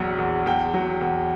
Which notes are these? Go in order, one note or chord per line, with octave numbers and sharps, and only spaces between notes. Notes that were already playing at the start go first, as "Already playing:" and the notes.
Already playing: A#1 E2 F#3
E2
E2 G5
F#3
E2